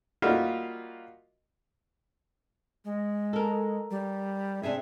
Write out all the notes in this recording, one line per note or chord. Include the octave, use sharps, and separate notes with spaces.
G3 A#3 F4 F#4 D#5 E5
G#3
A4 A#4
G3
C3 D4 G#4 E5